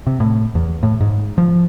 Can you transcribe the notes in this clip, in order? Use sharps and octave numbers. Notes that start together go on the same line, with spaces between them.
C3
A2
E2
A2
G#2
F3